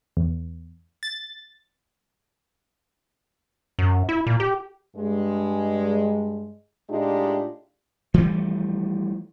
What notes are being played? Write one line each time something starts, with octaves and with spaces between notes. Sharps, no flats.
E2
A6
F#2
E4
A#2
G4
G2 G#3
A2 G#3 D4 D#4 F4 G4
E3 F3 G3 A3